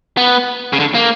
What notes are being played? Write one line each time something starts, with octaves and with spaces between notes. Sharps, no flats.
B3
C#3
D3
A#3